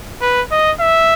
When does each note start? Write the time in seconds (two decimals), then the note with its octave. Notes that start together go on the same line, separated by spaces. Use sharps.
0.22 B4
0.52 D#5
0.80 E5